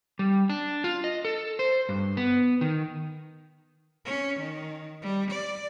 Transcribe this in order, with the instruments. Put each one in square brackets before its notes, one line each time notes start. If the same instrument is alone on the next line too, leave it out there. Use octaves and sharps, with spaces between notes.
[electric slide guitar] G3
D4
F4
D#5
A4
C5
G2
B3
D#3
[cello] C#4
D#3
G3
D5